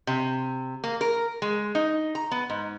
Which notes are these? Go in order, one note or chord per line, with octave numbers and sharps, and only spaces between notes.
C3
A#3
A#4
G#3
D#4
A#5
B3
G#2